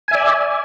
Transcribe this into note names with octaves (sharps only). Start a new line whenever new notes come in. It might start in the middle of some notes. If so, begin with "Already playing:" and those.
D5 E5 G#5